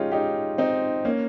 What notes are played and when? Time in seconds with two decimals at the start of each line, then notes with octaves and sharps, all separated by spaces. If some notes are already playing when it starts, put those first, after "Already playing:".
Already playing: G#3 C#4 D#4 F4 G4 G#4
0.12 D#4 G4
0.58 C4 D#4
1.04 A#3 C#4